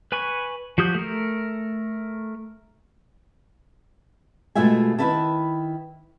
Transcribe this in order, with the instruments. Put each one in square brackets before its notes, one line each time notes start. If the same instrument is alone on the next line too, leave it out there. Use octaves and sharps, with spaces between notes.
[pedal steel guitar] B4 G#5 B5 C#6
F3 F#4 G4 D#6 G6
A3 A#4
[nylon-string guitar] B2 G#3 A3 F4 E5 G#5
D#3 E4 B4 E5 A5